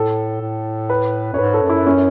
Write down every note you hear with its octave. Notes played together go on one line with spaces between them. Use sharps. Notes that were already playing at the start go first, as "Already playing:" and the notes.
Already playing: A2 A4
A2
B4
F#2 C#5
G#2 B4
A4
F#2
E4
C#4